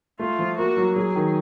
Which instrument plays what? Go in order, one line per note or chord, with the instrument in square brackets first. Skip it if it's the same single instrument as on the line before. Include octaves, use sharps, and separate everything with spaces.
[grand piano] A3 [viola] F4
[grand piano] F3
[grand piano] A#3 [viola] F#4
[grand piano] F#3
[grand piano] F#3 [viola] G#4
[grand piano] D#3